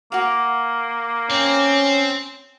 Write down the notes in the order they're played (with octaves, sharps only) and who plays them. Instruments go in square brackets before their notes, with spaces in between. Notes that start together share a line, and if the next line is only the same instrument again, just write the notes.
[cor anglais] A#3 [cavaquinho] F#4 F5
[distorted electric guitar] C4 [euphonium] C#4